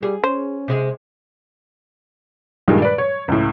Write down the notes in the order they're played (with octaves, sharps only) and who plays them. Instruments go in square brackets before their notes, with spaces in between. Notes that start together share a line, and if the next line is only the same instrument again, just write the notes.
[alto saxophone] G3 [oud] G#4
[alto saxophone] C#4 [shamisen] C5
[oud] C3 G#3 G#4
[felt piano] G2 A#2 D#3 G3 G#3
B4 D5
C#5
C#2 A2